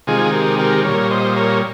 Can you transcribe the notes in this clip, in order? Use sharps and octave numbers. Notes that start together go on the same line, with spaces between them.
C3 D#3 G#3 F4 G#4
G4 A#4
G4 A#4
A#2 G3 A#4 C#5
C5 D#5
A#4 C#5